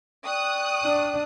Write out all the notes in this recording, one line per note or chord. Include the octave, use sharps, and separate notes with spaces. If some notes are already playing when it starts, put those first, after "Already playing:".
D5 G5 C#6 D#6 F#6
D4